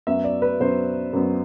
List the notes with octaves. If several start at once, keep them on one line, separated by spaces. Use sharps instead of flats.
F#2 F#3 B3 E5
D5
B4
F#2 F#3 B3 C5
F#2 F#3 B3